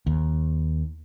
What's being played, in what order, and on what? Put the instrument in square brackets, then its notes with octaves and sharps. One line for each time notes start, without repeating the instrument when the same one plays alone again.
[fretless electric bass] D#2